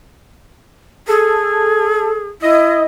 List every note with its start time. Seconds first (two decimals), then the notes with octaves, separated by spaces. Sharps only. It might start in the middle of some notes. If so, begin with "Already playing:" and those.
1.08 G#4 A4
2.42 E4 D#5